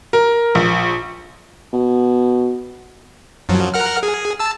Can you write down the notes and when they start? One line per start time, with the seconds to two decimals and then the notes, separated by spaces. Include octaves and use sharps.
0.13 A#4
0.55 A#1
1.73 B2
3.49 F#2 F3 F#3
3.74 A#4 F#5 F6
4.03 G#4
4.39 A5 E6